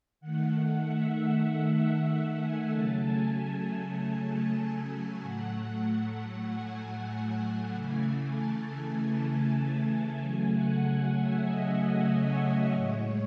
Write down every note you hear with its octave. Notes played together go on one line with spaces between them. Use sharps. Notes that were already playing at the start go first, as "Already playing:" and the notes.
D#3 A3 F#5
E5
F#5
G#5
C#3 F#3 A3 A5
G#5
G#5
G#5
A2 F#3 A3 F#5
G#5
C#3 E3 A3
A5
C#3 F#3 A3 G#5
F#5
F#5
E5
D#5
C#5
A2 G#3